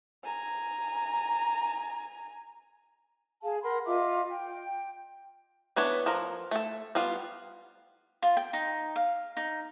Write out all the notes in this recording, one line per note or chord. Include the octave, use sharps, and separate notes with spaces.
G#5 A#5
G#4 F5 A5
A#4 F#5 B5 C6
F4 D#5 E5 D6
G5
E3 B3 D4 C#5
F3 A#4
A3 A4
G3 B3 F4
F4
G5
D#4
F5
D#4